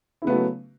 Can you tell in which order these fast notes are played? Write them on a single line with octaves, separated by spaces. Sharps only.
E4 C#3 B3 A3 F#3